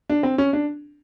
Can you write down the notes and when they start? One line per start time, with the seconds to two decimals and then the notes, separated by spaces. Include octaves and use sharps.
0.10 D4
0.23 C4
0.38 C#4
0.53 D4